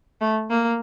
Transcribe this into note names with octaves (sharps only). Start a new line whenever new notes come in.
A3
A#3